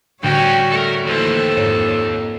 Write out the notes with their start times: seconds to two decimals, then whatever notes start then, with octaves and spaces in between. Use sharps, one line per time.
0.23 D2 A2 D3 G3 C#4 F#4 C#5 G5
0.72 A3 A4 A#4
1.06 D#2 E3 A3 A4 C5
1.57 F2 G#2 A#3 C#5